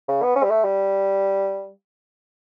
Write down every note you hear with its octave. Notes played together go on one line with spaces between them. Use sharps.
C#3
B3
C#4
G3
A3
G3